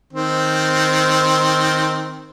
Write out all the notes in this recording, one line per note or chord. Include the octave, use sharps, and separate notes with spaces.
D#3 C4